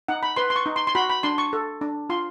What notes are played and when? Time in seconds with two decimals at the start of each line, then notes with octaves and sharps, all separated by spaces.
0.08 D#4 F#5
0.23 B5
0.37 B4 C6
0.50 C6
0.56 C#6
0.66 D#4
0.76 C6
0.87 C6
0.95 F#4 B5
1.10 B5
1.23 D4 C6
1.38 C#6
1.53 A4
1.81 D4
2.10 F4 C6